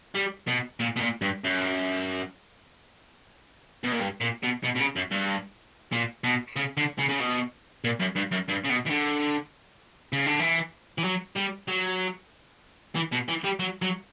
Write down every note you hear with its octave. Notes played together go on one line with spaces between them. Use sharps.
G3
B2
A#2
B2
A#2
G2
F#2
B2
A#2
G2
A#2
B2
B2
B2
C#3
F#2
G2
A#2
B2
C#3
D3
C#3
C#3
B2
A#2
F#2
G2
F#2
G2
C#3
B2
E3
D3
C#3
D3
E3
E3
F#3
G3
F#3
E3
B2
E3
G3
F#3
F#3